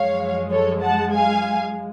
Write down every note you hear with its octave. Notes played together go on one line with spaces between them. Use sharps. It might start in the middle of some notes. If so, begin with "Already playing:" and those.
Already playing: F#2 F3 G#3 C#5 F5
A4 C#5
F#5 A5
F5 G#5